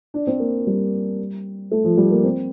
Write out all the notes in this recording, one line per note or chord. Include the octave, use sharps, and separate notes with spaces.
D4
C4
A#3
G3
A3
F3
G3
A#3
C4